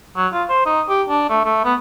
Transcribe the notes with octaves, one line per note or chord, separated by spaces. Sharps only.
F#3
F4
C5
D#4
G4
D4
A3
A3
B3